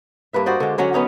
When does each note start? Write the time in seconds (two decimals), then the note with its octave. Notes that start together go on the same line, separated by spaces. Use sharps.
0.33 G2 A#3 B4 E5
0.46 F#4 C5 D5 D#5
0.60 D3 G#3
0.78 D3 F#3 C#4 F#4
0.93 B3 C#4 D#4 F#4